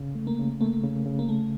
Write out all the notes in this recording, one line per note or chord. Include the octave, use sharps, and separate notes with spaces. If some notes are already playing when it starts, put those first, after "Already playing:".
Already playing: C#3
A3
A#3
C#3
A3 A#3
C#3
C#3
A#3
C#3 A3